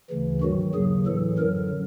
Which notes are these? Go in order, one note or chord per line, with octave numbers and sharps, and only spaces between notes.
D2 C#3 E3
G2 D#3 F#3 F#4
D#2 C#3 F#3 G#4
A2 E3 A4
F#2 D3 F#3 A#4